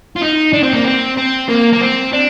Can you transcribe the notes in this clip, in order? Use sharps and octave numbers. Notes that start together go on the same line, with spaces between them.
F4
D#4
D4
C4
A#3
C4
C4
A#3
A#3
C4
D4